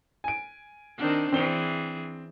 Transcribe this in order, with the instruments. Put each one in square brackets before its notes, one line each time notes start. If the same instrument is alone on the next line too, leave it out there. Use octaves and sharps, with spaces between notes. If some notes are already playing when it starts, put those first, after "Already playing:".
[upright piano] G#5 D7
[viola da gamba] D#3 C4 D4
[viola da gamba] E3 G#4 [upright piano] C4 D4 G7